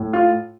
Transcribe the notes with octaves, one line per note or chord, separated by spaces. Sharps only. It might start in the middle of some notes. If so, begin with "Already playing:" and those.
Already playing: A2
F4